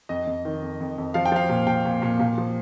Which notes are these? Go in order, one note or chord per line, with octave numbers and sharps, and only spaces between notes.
F2 D#5
F2
D#3
F2
F2
F2
F3 F5
G5
F3 F5
A#2
A#2 G5
A#2
A#2
A#2
F3